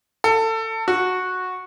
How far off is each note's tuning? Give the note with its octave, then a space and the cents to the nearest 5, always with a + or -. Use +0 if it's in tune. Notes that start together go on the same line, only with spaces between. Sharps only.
A4 +25
F#4 -10